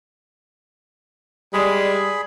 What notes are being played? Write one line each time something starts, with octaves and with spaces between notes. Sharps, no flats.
G3 G#3 G#4 D5 G#5 B5